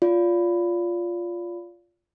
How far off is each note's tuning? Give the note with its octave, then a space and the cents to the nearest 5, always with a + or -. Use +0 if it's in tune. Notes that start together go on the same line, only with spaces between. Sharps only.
F4 +0 D5 -35